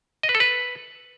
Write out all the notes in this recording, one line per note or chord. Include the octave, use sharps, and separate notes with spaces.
D#5
B4
A4
B4